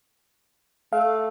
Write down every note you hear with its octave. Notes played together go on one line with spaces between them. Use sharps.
A3 F5